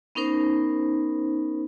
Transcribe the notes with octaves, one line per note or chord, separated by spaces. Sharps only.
B3 C#4 D#4 A#4 C5